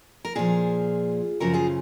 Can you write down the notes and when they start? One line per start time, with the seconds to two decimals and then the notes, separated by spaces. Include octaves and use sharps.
0.25 A#4
0.35 A#2 F3 F4 G#4
1.40 F#2 C#3 F3 F#4 A#4
1.53 F4 G#4